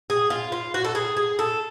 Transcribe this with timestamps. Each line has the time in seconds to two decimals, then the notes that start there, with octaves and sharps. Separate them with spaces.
0.10 G#4
0.30 F4
0.52 F4
0.74 F#4
0.84 A4
0.95 G#4
1.17 G#4
1.39 A4